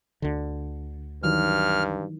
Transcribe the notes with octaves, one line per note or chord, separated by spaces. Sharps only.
D2 D3
G2 D#3 E3 F#3 F6